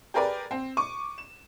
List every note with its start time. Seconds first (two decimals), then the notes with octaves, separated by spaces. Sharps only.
0.14 G4 G#4 A#4 B4 D5
0.51 C4
0.77 C#6 D6 D#7
1.18 E7